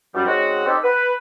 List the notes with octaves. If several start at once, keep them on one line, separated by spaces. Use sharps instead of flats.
F#2 G3
G#3 C4 C#4 D#4 F#4
C4 D#4 G4 A4
B4